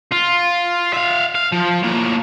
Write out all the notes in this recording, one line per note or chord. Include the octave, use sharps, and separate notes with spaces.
F4
E5 F5
F5
F3
A2 A#3